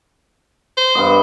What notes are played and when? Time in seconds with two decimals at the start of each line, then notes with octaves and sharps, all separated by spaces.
0.77 C5
0.95 G2 B3 D#5